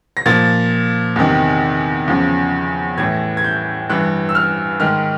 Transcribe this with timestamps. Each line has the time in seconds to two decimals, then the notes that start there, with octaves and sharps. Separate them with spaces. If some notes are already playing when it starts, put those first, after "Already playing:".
0.17 A#6
0.26 A#2 F3 A6
1.16 E2 C3 D#3
2.08 E2 C#3 F3
2.98 A2 E3 G#6
3.37 G#6
3.44 G6
3.89 G2 E3 F#6
4.29 E6
4.35 F6
4.80 G#2 D#3 F6